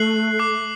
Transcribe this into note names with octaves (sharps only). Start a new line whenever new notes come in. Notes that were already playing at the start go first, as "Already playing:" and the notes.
Already playing: A3 F#6 C7 F#7
D6 F#6 C7